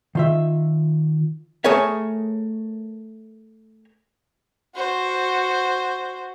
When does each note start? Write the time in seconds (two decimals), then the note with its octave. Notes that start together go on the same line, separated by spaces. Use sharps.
0.15 D#3 F4 E5
1.64 A3 G#4 A#4 C#5 E5
4.76 F#4 C5